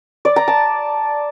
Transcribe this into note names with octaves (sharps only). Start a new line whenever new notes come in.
D5
A#5
A5